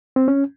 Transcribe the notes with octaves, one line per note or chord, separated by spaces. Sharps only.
C4
C#4